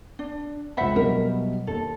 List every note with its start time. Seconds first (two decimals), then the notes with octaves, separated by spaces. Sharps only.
0.19 D4
0.77 C#2 C5 E5 F#5 B5
0.96 B2 F#3 G3 A#4 E5
1.67 D#2 A4